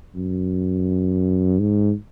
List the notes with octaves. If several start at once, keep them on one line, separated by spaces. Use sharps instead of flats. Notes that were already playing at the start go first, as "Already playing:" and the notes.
F#2
G#2